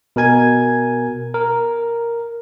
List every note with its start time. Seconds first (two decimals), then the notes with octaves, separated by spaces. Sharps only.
0.16 B2 A#4 G#5 G#6
1.34 A#4